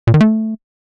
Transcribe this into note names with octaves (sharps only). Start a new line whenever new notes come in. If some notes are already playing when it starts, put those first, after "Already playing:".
A#2
D#3
A3